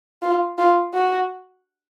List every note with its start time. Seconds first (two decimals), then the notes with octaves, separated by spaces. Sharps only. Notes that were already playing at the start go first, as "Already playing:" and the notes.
0.22 F4
0.58 F4
0.94 F#4